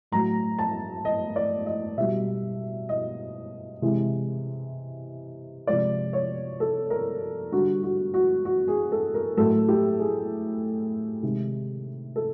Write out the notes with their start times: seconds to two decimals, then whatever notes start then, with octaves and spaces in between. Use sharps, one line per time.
0.12 A2 F#3 A#5
0.58 A5
1.05 D#5
1.36 D5
1.66 D#5
1.98 B2 G3 E5
2.89 D#5
3.82 C3 E3 G#3
5.67 C3 F3 G#3 D5
6.13 C#5
6.60 A4
6.90 A#4
7.52 D3 G3 F#4
7.83 F#4
8.14 F#4
8.45 F#4
8.68 G#4
8.92 A4
9.14 A#4
9.37 A2 F#3 A4
9.68 G4
9.99 G#4
11.22 C3 D#3 G#3
12.16 A4